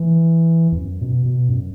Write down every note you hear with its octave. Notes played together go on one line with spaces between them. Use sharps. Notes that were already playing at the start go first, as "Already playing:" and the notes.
Already playing: E3
E2
F#2
B2
B2
F#2